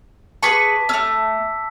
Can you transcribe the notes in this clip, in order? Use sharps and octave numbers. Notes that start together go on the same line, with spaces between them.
G#4 B4 A5 C#6 D6 B6
A3 C#4 E6